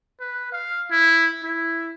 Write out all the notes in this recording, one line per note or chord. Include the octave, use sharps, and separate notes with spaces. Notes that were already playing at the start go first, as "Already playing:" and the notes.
B4
F5
E4
E4